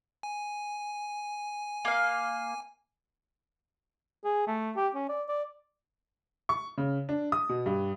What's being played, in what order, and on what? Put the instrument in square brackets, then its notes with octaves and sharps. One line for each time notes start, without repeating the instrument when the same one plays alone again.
[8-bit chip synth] G#5
[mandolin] A#3 F5
[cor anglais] G#4
A3
G4
C#4
D5
D5
[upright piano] C#6
C#3
D4
D#6
B2
G2